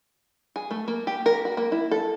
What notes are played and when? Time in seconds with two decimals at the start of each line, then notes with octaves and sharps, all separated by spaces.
0.56 G#4
0.71 A3
0.88 A#3
1.07 G4
1.26 A#4
1.45 F#4
1.57 A#3
1.72 E4
1.91 A4